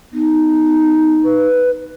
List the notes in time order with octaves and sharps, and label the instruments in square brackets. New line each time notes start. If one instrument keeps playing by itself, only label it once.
[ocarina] B3 [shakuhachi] D#4
[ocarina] B4